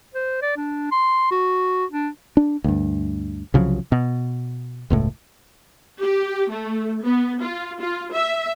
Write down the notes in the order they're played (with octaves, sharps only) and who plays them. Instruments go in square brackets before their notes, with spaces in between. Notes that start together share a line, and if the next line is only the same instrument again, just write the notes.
[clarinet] C5
D5
D4
C6
F#4
D4
[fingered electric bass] D4
D2 G2
C2 C#3 F3 F#3
B2
E1 C#2 A2
[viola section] G4
A3
B3
F4
F4
E5